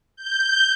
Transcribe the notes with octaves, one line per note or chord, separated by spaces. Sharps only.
G6